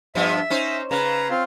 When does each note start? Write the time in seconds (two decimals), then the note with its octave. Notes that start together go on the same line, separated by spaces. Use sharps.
0.15 G2 F3 B3 E5
0.50 C#4 D#4 C5
0.91 C#3 B4 A#5
1.30 C4 F4 F5